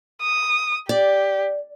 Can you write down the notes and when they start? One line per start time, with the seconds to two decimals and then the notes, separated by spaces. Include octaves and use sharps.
0.21 D#6
0.89 G4 D5